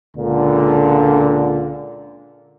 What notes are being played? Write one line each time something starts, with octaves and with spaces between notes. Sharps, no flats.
C#2 A#2 D3